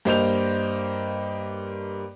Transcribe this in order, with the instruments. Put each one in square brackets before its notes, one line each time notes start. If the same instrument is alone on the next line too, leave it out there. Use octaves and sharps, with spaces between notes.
[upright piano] G2 A#3 C5 D#5 G6 F7